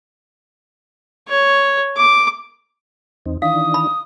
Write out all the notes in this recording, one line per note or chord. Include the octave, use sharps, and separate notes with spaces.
C#5
D6
E2 C4 D#4
D#3 E3 D4 F5 D#6
B5